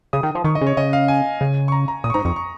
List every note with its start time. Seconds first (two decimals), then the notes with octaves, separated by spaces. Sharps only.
0.13 C#3 D#6
0.23 D#3
0.35 F3
0.44 D#3 C#6
0.55 D#5
0.61 C#3
0.67 C#5
0.77 C#3 D#5
0.93 F5
1.08 G#5
1.41 C#3
1.68 C#6
1.72 A#5
1.88 A#5
2.04 A#2 D#6
2.10 C#6
2.14 G#2 A#5
2.25 F2 C#6
2.36 C#6